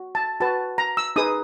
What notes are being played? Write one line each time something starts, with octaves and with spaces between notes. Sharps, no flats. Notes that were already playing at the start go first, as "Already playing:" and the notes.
Already playing: F#4
A5
F#4 B4 A5
A#5
E6
D#4 G#4 B4 D#6